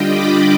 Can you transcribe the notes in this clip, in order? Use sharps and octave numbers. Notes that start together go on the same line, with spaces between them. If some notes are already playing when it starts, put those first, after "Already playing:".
Already playing: D3 G3 D4 F4 D#5 G5
B5 D6